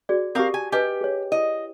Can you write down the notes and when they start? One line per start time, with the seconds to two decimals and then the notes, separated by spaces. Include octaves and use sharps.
0.09 F#4 G#4 D5
0.35 C4 G4 A#4 F5 D6 D#6
0.54 G#5
0.72 G4 B4 D#5 G#5
1.01 G#4 C#5
1.32 E4 D#5